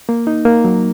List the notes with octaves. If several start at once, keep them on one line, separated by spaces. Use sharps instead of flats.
A#3
D#4
A#3
F#3